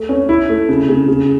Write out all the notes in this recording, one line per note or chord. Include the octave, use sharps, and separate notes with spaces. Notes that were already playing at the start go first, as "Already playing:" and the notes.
Already playing: A3
C#4
E4
A3
C#3
C#3
C#3